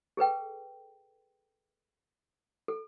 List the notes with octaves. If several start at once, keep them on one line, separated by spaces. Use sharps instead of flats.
G#4 A4 B4 G5
A4